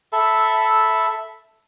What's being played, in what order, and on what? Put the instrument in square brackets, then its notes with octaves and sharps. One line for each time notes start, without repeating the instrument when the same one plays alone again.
[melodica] A4 E5 B5